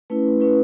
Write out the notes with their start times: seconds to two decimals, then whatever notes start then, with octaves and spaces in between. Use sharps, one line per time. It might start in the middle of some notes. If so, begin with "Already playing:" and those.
0.10 A3 C#4 E4 B4
0.40 A3 C#4 E4 B4